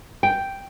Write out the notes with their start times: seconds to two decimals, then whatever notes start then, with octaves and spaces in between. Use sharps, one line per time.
0.23 G5